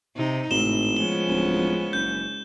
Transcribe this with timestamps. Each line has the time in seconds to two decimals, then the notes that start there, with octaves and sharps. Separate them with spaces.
0.16 C3 D#4
0.51 G#1 A2 E7 G7
0.97 F3 G#3 B3 C#4 G7
1.29 D1
1.93 F#1 G6